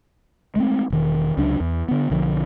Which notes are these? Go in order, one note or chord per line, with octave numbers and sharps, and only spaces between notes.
G#3 A3 B3 C4
E1 D#3
C#2 C3 F#3 D4
E2
D3 B3
B1 D3 E3 F3